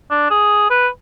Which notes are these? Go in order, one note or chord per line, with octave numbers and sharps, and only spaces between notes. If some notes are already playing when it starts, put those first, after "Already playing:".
D4
G#4
B4